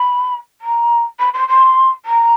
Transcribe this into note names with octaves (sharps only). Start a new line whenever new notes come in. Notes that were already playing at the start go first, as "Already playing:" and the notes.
Already playing: B5
A#5
B5
C6
C6
A#5